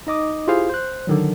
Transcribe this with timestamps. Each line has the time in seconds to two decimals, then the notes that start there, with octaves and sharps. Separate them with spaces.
0.07 D#4 D#5 D6 D#6
0.47 E4 F4 G4 G#4 C5 F5
0.70 C5 F#6
1.07 D3 D#3 F#3